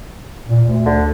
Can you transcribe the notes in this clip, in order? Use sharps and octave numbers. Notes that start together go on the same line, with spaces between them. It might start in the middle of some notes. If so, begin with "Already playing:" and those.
A#2
D2
D3